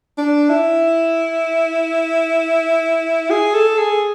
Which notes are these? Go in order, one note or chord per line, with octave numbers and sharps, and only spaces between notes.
D4
E4
G#4
A4
G#4